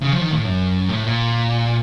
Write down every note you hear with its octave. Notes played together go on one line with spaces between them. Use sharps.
C#3
F3
D#3
A2
F#2
A2
A#2